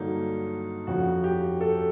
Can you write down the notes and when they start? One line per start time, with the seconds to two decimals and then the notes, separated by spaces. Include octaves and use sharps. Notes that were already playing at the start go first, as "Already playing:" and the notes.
Already playing: G2 D3 F#3 A#3 D#4
0.87 F2 C#3 F3 F#4
1.24 G4
1.61 A4